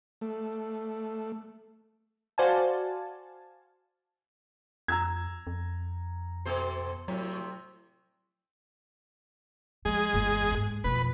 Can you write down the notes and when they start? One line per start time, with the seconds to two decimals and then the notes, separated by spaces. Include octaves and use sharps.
0.21 A3
2.38 F#4 C5 D5 F5 G#5 A5
4.88 F2 A#5 E6 G#6
5.47 F2
6.45 B2 A4 C5
7.08 A2 C3 F#3
9.85 F3 G#3 G#4
10.13 G1 E2
10.52 G#2
10.84 B1 F2 B4